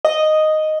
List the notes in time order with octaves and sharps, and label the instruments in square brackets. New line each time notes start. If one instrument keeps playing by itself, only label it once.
[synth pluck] D#5